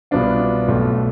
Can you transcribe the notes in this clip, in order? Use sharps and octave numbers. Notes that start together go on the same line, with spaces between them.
C2 B2 B3 D4 F4
B1 B2 A3